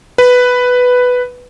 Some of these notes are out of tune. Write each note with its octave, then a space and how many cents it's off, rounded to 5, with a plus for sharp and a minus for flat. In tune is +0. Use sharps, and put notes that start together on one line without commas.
B4 +5